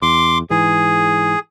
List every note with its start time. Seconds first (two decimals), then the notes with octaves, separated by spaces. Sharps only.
0.02 E2 C6 D6
0.50 G#2 E3 G#4